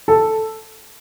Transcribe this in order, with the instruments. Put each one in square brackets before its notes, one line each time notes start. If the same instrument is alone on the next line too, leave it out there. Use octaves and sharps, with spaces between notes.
[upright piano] A4